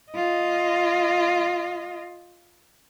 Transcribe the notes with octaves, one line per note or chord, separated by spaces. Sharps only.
F4 D#5